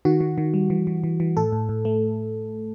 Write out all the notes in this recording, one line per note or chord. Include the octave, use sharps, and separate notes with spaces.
D#3 F#4
D#3
D#3
G3
E3
E3
E3
E3
A2 A4
A2
A2
A3